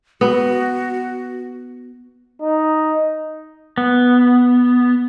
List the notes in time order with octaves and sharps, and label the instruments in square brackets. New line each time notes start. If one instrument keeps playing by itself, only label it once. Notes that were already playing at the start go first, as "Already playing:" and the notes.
[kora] B3 [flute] F#4
[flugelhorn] D#4
[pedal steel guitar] B3